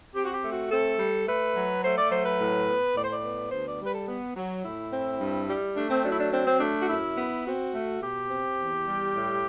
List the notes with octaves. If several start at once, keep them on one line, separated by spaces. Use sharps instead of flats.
C4 G4
F#4
G4
A3
F#4
C4 A4
G3
A3 B4
F#3
A3 C5
D5
F#3 C5
B4
A2
B3
A2 D5
C5
D5
B3
D2 C5
D5
G3
B4
A4
B3
F#3
A2 E4
C4
G2
G3
A3 D4
C4
F#3 D4
E4
D4
C4 D4
C4
A3 D4
F#4
F#2 E4
B3
C4 F#4
A3
B2 G4
C4
E2
G3
A2